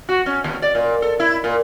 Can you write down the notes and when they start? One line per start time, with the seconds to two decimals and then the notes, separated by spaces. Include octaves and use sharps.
0.09 F#4
0.26 C#4
0.44 D#2
0.62 D5
0.75 A#2
1.02 A4
1.20 E4
1.44 A#2